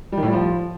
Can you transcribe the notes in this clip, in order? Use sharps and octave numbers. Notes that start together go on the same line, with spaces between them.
G3
D#3
A2
G3
F3